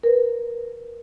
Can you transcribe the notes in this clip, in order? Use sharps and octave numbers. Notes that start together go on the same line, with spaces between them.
A#4 B4